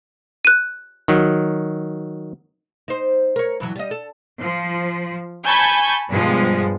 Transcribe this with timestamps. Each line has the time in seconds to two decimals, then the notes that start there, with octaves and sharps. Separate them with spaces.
0.45 F#6 D#7
1.08 D#3 F#3
2.88 D#4 C5
3.36 A#4 C#5
3.60 G2 E3 F#3
3.76 G3 D#5
3.91 A4
4.42 F3
5.46 G#5 A5 B5 C#6 G6 G#6
6.08 G2 B2 F3 G#3